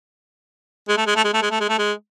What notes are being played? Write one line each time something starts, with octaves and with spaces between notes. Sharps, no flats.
G#3
A3
G#3
A3
G#3
A3
G#3
A3
G#3
A3
G#3